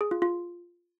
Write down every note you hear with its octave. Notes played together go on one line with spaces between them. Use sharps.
G#4
F4
F4